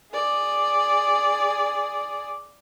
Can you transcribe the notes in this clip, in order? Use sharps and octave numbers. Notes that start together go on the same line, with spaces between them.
G#4 D5